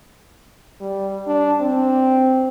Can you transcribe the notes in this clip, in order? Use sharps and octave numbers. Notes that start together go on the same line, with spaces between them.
G3
D4
C4